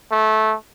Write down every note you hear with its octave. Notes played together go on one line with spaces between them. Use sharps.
A3